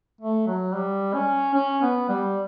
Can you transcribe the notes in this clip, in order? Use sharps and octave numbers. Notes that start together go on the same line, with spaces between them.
A3
F#3
G3
C#4
C#4
B3
G3